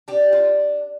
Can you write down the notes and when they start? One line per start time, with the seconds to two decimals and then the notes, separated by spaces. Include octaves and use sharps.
0.08 D4 G4
0.33 F4